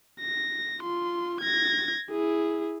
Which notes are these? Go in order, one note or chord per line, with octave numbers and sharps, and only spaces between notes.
A#6
F4 C6
G#6 A#6
E4 G#4